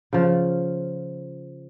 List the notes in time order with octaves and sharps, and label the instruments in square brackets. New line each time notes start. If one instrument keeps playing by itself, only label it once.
[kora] C#3 F3